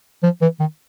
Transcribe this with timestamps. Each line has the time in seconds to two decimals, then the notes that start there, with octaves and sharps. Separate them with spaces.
0.23 F3
0.42 E3
0.60 D#3